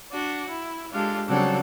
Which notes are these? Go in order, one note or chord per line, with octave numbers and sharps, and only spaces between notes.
D4 F#4
E4
G#3 D4 F4 G4 A4
C#3 F#3 G3 C4 D4 A4